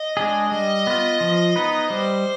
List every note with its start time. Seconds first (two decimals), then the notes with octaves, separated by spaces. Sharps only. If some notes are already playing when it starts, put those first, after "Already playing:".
Already playing: D#5
0.17 G#3 D4 G#4
0.51 G3 D#5
0.87 B3 F4
1.21 F3
1.56 B3 D#4 B4
1.90 G3 C5